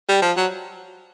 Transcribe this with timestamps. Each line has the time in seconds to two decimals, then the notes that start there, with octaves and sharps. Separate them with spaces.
0.09 G3
0.22 F3
0.37 F#3